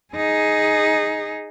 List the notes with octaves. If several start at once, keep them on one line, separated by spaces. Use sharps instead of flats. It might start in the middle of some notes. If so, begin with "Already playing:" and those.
D#4 G#4